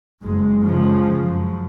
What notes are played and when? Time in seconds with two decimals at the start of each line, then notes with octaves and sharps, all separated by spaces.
0.24 F#1 G#3
0.63 C#3 F3 G#3
1.24 F#2